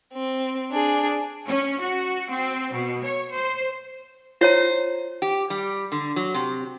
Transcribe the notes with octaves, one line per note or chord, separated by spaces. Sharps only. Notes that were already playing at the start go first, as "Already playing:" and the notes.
C4
D4 G#4
C#4
F#4
C4
B2
C#5
C5
F4 C5 C#5 A#5
G4
G3
D3
F#3
C3